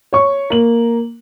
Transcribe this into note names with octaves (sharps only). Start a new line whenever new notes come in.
C#5 C#6
A#3 F#7